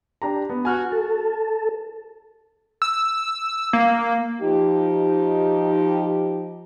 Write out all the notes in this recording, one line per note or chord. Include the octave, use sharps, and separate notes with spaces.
D4 G4 A#5
B3
F#4 G#5 F6 F#6
A4
E6
A#3
F3 D#4 G4